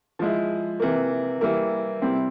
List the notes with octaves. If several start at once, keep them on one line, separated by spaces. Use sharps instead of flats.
F3 G#3 E4
C3 E3 A#3
E3 G3 A#3 E4
C3 G3 C4 E4